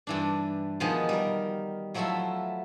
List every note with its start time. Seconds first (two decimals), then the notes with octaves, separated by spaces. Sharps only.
0.07 G2 E3 D4
0.80 B2 D#3 F3 G#3 B3
1.09 G3 A#4
1.94 F3 F#3 A3 E4 F4 E5